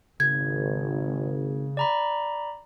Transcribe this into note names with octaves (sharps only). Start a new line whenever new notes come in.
G#1 C#3 G#6
D5 A#5 B5